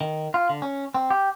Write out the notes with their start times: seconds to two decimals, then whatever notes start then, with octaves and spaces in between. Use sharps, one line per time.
0.01 D#3
0.34 F4
0.49 D3
0.62 C#4
0.95 C4
1.10 G4